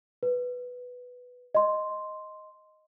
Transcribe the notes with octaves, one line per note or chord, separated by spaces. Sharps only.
B4
D#5 C6